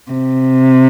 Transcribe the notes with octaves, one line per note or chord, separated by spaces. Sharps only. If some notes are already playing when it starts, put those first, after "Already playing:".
C3